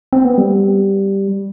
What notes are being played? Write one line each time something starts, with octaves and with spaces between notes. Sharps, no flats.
C4
B3
G3